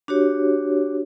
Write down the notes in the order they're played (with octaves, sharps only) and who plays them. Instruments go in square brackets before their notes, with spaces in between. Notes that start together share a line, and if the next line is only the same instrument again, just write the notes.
[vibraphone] D4 F#4 G4 C#5